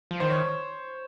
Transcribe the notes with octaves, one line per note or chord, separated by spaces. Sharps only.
F3
D#3 C5
C#5